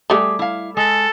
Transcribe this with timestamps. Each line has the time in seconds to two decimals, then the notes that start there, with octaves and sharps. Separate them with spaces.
0.10 G3 A3 G4 G#4
0.39 E4 F5
0.77 G#3 A4